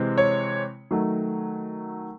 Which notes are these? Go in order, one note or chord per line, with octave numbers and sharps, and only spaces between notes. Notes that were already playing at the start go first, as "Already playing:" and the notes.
Already playing: C3 E3 G#3 C4
C#5
D#3 F#3 A3